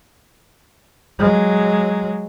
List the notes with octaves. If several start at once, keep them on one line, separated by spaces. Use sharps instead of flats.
F#3 G#3